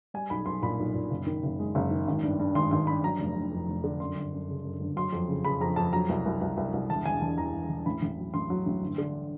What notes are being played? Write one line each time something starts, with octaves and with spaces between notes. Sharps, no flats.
G3 G#5
B1 B5
B1 C6
A#2 B5
B1
A#2
F#1
D#3
F#1
G#3
F#1
D#3
G#1
G2
G2
G#1 C6
G#1 C6
G2 B5
F#3 A#5
F1
F1
F2
F1
D3
F#2 C6
G1
F#2
C#3
F#2
G1
F#3 C6
F2
C#3
C#3 B5
F2 A#5
F2 A5
F#3 A#5
C2
C2
C2
C2
C2
E1 A5
E1 G#5
E1 A5
E2 A#5
E2
E1
A1 B5
A1
F#3
A1 C6
F#3
A1
G1
D3